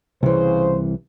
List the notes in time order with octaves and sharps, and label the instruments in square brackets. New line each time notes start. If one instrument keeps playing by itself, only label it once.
[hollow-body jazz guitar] C2 E3 [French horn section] C#3 C5